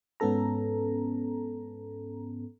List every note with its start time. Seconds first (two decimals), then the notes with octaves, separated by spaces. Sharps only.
0.20 G#2 B3 C#4 A4 A#5